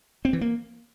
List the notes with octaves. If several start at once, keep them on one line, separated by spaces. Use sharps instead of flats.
C4
E3
A#3